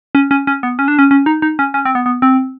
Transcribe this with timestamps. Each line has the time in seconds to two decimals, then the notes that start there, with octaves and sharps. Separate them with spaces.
0.15 C#4
0.31 C#4
0.47 C#4
0.63 B3
0.79 C#4
0.88 D4
0.99 C#4
1.11 C#4
1.26 D#4
1.42 D#4
1.59 C#4
1.74 C#4
1.85 C4
1.95 B3
2.06 B3
2.22 C4